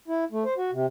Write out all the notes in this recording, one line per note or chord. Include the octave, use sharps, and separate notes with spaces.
E4
A3
C5
F#4
C3